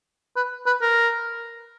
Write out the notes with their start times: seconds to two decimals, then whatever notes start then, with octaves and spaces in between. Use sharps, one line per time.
0.36 B4
0.67 B4
0.82 A#4